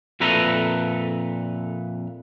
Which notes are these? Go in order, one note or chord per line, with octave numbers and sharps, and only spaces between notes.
F2 A#2 A4 B4 E5 A#5